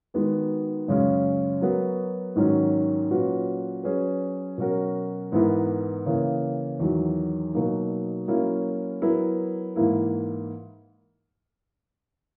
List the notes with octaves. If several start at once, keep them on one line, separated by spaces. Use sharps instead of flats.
D#3 G#3 B3 D#4 F#4
F#2 C#3 G#3 C#4
F#3 B3 F#4 A#4
G#2 D#3 F#3 C#4
A#2 F#3 C#4 F#4 B4
F#3 C#4 G#4 B4
B2 F#3 C#4 F#4 A#4
G#2 E3 B3 E4 A#4
C#3 E3 A#3
E2 D#3 F#3
B2 F#3 A#3 D#4
F#3 A#3 C#4 E4
F#3 B3 E4 A#4
G#2 E3 A#3 E4